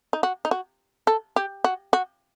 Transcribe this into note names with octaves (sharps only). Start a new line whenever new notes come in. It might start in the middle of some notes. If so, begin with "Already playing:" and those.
D#4
F#4
D#4
F#4
A4
G4
F#4
F#4